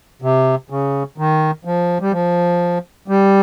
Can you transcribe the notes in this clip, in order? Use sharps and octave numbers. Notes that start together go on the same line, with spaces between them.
C3
C#3
D#3
F3
G3
F3
G3